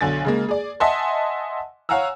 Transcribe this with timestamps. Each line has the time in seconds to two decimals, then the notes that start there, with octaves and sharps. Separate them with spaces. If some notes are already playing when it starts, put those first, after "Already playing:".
0.01 B1 D3 G#5 A6
0.25 C#3 G#3 A#3
0.49 G#4 D5
0.80 D#5 E5 F#5 G#5 A5 C6
1.89 C#5 F5 F#5 G#5 A#5 E6